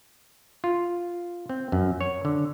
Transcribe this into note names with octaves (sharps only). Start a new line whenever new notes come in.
F4
C4
F#2
C#5
D3